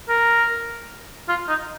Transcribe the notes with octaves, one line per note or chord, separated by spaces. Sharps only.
A#4
F4
D#4